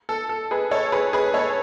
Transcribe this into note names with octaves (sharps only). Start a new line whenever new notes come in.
A4
A4
G#4 B4
A4 C#5
A4
G#4 B4
G#4 B4
A4 C#5